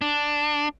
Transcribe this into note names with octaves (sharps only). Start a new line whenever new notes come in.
D4